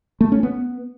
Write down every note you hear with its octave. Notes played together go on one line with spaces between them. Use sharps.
A3
C#4
B3